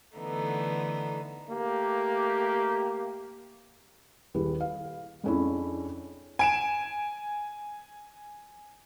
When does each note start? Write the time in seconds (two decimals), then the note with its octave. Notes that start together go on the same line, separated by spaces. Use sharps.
0.18 D3 E3 A3 B3 D#4
1.50 A3 A#3 G4
4.34 D#1 E4 G4 G#4 B4
4.61 F5
5.24 F2 G#3 C#4 D4 E4
6.39 G#5 D7 E7